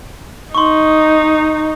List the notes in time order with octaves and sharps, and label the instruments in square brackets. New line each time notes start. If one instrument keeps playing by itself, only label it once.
[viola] D#4 [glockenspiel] C6 C#6